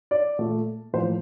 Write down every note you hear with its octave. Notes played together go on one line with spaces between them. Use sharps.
D5
A#2 A3
A2 F3 A#3 C5